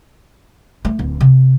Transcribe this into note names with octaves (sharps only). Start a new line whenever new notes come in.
A3
D1
C3